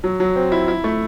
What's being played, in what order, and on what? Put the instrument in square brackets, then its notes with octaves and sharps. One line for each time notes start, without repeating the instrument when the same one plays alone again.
[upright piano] F#3
F#3
C4
E4
E4
A3